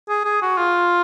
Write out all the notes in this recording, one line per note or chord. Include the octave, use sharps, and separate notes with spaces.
G#4
G#4
F#4
F4